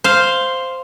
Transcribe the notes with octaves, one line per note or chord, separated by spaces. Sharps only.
C5 F5